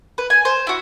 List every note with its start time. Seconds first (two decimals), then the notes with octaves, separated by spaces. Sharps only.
0.18 B4
0.30 G#5
0.45 C5
0.67 E4 F#4